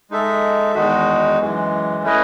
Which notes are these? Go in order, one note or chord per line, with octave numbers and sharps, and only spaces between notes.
G#3 D#4 A4 E5
E2 D#3 G#3 D#4 F#4
F#2 E3 G#3
A3 C#4 E4 B4 D#5